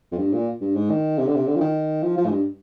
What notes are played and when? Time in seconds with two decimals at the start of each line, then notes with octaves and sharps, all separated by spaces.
0.12 F2
0.18 G2
0.33 A#2
0.61 G2
0.76 G#2
0.90 D#3
1.18 C3
1.27 D3
1.35 C3
1.47 D3
1.56 F3
1.61 D#3
2.03 F3
2.17 F3
2.26 G#2
2.31 G2